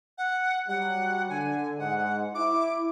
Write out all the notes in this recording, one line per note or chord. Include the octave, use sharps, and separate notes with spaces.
F#5
F#3 G3 F#5
D3 G#5
G#2 F#5
E4 D6